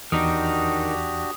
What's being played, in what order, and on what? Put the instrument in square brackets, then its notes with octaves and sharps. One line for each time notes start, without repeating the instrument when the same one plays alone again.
[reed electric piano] E2 [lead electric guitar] D#3 D#4 [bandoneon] D4 F#4 G4 [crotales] D#6